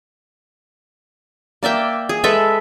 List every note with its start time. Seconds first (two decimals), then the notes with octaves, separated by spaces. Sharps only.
1.63 A#3 D5 E5 G5
2.09 G#4
2.24 G#3 A4 B4 E5